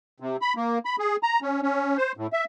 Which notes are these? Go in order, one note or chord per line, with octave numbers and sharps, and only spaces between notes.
C3
B5
A#3
B5
G#4
A#5
C#4
C#4
C5
A2
E5